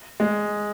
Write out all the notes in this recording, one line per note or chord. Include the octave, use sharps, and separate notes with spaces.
G#3